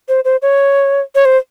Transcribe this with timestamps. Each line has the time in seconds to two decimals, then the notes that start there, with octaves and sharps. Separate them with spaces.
0.09 C5
0.25 C5
0.42 C#5
1.15 C#5
1.25 C5